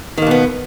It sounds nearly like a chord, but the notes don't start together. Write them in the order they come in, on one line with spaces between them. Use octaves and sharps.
D#3 A#3 B2 B3